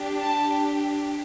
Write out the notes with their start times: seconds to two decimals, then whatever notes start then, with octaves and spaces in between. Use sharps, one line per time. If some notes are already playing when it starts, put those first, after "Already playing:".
Already playing: D4 G4
0.20 A5